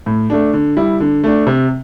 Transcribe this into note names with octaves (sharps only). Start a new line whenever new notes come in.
A2
A3 D4
D3
G3 E4
D3
A3 D4
C3